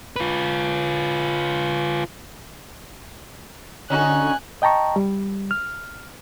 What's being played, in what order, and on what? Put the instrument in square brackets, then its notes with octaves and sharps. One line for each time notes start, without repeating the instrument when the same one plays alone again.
[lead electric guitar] F4 B4
[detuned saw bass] D3 [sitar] C#4 D#4 F#4 [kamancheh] G#5 F#6
[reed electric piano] D#5 G5 A5 A#5 C#6
G3
F6